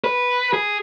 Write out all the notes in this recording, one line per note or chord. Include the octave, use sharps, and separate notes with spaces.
B4
G#4